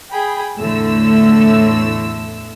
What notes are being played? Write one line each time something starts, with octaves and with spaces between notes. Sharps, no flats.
G#4 G5 B5
E2 A2 D3 A3 E6